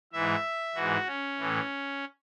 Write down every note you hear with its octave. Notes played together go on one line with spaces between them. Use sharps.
G#2 E3 E5
G#2 E3 F#4
C#4
A2 E3